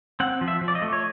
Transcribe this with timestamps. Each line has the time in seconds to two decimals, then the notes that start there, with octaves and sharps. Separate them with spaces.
0.20 C4 F#5
0.41 F3
0.48 E5
0.61 F3
0.68 D5
0.75 D#5
0.82 A3
0.93 C#5